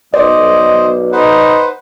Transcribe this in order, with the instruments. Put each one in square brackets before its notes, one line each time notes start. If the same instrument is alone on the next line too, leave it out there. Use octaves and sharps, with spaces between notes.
[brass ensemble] B1 [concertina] C5 [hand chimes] D5 [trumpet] D#5
[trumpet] D#4 [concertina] B4 C5 F#5